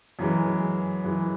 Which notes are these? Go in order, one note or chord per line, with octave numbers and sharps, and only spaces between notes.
F#2 E3 G#3
F#2 E3 G#3